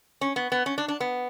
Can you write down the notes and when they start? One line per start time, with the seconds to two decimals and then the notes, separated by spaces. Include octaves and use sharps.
0.21 C#4
0.36 B3
0.52 B3
0.66 C#4
0.78 D4
0.88 D4
1.00 B3